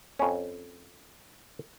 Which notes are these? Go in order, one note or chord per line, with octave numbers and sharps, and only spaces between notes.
F2 C#4